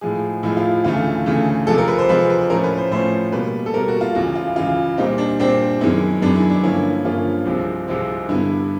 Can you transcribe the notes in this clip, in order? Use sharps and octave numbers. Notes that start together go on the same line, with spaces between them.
A2 F3 G#3 G#4
A2 F3 G#3 E4
F4
D2 C#3 E3 A3 F4
D2 C#3 E3 A3
C3 F3 G#3 A4
A#4
B4
C5
C3 F3 G#3 B4
B4
A2 F3 A3 C#4 A#4
B4
C5
A2 F3 A3 C#4 C5
B2 G3 A#3 B4
A4
B2 G3 A#3 A#4
F#4
F4
C#2 C#3 E3 F#4
F4
C#2 C#3 E3 F4
A#2 G3 C4 D#4
D4
A#2 G3 C4 D4
F#2 D#3 G#3 B3 E4
F#2 D#3 G#3 B3 D4
E4
D4
G2 D3 F3 A#3 C#4 E4
G2 D3 F3 A#3 C#4 F4
C2 C3 F3 G#3 C4
C2 C3 F3 G#3 C4
G2 D3 G3 B3 E4